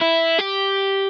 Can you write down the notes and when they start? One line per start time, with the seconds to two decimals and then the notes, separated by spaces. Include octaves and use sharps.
0.01 E4
0.38 G4